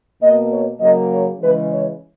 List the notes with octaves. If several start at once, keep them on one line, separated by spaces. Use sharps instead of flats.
B2 A#3 D#5
C#5
C#3 F#3 A#3 D#5
C#5
C#3 E3 G#3 B4
C#5